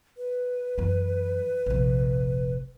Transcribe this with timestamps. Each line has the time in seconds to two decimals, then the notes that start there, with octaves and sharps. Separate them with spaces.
0.17 B4
0.78 F#2 E3
1.66 F1 A#1